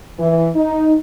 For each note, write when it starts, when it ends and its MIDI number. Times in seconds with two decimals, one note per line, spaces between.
0.18 0.49 52
0.55 0.94 63